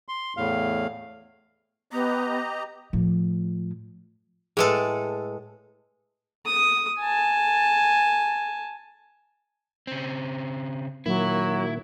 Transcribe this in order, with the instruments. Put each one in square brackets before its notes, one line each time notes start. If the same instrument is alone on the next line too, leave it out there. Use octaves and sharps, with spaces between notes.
[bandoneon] C6
E2 A2 F5
[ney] B3 [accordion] G4 D#5 A#5
[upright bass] A2 F3
[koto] A2 G#3 A4 [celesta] G#4 B4
[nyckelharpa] D#6
G#5 A5
[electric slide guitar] C#3 C4
[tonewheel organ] A#2 D#3 A#3 [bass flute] F#3 [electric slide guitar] E4